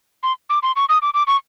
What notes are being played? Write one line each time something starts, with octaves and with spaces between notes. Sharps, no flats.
C6
D6
C6
C#6
D#6
D6
D6
C#6